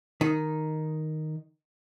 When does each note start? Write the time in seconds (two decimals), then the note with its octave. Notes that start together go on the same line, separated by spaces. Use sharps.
0.21 D#3 D#4